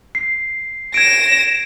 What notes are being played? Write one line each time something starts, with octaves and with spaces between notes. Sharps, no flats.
C7
G#6 A#6 D7 E7